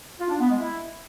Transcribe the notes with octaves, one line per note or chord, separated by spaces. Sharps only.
F4
D4
B3
G#3
E4